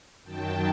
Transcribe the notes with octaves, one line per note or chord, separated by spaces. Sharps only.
F#2 D#3 F#3 G5 A5